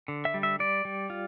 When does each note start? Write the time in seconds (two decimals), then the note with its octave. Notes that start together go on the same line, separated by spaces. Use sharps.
0.08 D3
0.25 E5
0.34 G3
0.43 E5
0.59 G3 D5
0.85 G3
1.10 F4